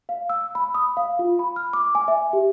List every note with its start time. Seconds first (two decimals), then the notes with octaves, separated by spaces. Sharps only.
0.09 F5
0.30 E6
0.55 B5
0.75 D#6
0.97 F5
1.19 F4
1.39 B5
1.56 F6
1.73 D6
1.95 G#5
2.08 E5
2.33 G4